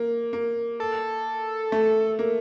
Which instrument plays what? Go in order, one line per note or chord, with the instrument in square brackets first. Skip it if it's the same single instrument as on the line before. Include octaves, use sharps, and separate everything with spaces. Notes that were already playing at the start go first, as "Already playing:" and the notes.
Already playing: [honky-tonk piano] A#3
A#3
[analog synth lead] A4
[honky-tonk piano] A3
A#3